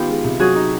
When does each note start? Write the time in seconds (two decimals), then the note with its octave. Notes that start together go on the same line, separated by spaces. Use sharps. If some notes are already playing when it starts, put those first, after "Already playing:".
Already playing: D#3 B3 F4 G4
0.09 G#3
0.24 C3
0.40 F#3 F#4 G#4
0.56 D#4